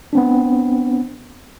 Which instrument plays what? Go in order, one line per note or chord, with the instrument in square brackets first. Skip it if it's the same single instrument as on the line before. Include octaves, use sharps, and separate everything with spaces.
[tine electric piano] B3 C4 D4